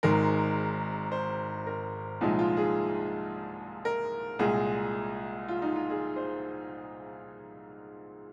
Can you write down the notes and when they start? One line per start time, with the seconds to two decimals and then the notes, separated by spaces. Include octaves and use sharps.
0.03 G#1 G#2 D#3 G#3 A#4
1.12 C5
1.67 A#4
2.21 C2 A#2 F3 G#3 D#4
2.39 F4
2.57 G#4
3.85 A#4
4.39 C2 A#2 G#3 G#4
5.48 F4
5.62 D#4
5.76 F4
5.90 G#4
6.16 C5